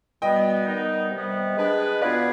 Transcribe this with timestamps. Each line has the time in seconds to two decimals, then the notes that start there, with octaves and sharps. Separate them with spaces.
0.22 B2 G3 B3 D#5 G5
0.66 D#3 G3 B3 D#4
1.11 C3 G3 B3
1.56 G#3 D4 G#4 B4
2.01 B2 B3 F4 G#4 B4 D5 F5